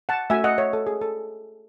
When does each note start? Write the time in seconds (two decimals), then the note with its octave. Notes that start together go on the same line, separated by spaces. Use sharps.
0.09 F#5 A5
0.30 A3 C#4 F#4 E5 G#5
0.44 D#5 F#5
0.58 C#5 E5
0.73 A4
0.87 G#4
1.01 A4